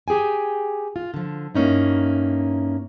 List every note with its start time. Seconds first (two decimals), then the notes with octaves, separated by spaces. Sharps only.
0.08 G4 G#4 G5 G#5
0.96 F4
1.14 D3 F3
1.55 G2 A#3 C#4 D#4 E4